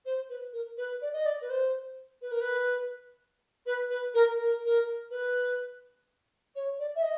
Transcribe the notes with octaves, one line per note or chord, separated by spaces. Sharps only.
C5
B4
A#4
B4
D5
D#5
D5
B4
C5
B4
A#4
B4
B4
B4
A#4
A#4
A#4
B4
C#5
D5
E5
D#5